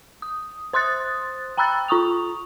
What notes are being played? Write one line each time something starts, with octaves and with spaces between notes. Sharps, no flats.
D#6
C5 C6 D#6 F#6 A6
G5 A#5 B5 E6 F#6 A6
F4 A#5 C#6 D#6 F7